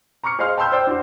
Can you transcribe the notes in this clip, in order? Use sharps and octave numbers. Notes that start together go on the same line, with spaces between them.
A#5 C#6 D6 F6 C#7
G#4 C5 D#5 F5 C6 F6
G5 A5 B5 C6 E6 G6
C5 D5 G5 E6
D4 E4 F#4 C5